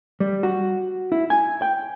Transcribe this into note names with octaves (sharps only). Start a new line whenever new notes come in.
G3
F#4
E4
G#5
G5